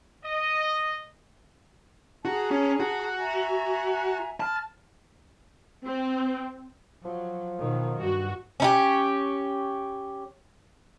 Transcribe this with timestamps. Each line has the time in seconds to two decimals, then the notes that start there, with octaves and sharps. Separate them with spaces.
0.24 D#5
2.25 F#4 G#4 A5 A#5
2.51 C#4
2.80 F#4
3.19 E5 G#5 A#5
4.40 A5 B5 F6
5.86 C4
7.05 F3 F#3
7.60 B2 D#3 F#3
7.98 G2 F#4
8.60 C#4 D#4 G4